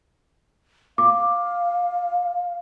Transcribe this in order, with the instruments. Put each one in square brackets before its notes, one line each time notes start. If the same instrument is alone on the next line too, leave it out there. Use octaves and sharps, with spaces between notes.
[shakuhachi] F5 [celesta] D6